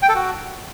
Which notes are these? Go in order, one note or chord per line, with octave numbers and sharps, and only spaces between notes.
G5
A4
F#4